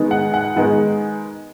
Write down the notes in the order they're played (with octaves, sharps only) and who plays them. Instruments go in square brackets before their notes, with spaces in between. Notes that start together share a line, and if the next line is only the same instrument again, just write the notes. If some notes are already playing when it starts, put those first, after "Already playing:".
Already playing: [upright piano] D#3 G#3 B3 D#4
F#5
F#5
D#3 G#3 B3 D#4 F#5